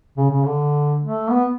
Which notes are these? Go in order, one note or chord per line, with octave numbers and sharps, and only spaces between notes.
C#3
C#3
D3
A3
B3